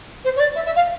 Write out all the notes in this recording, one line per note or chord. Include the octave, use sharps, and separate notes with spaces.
C5
C#5
D5
E5
E5
F5